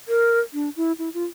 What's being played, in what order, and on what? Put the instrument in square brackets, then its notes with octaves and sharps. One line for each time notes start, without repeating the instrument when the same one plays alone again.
[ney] A#4
D4
E4
E4
F4